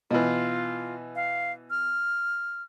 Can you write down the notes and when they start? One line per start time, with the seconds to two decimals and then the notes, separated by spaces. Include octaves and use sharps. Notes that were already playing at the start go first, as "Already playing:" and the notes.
0.11 B2 E3 F4
1.15 F5
1.70 F6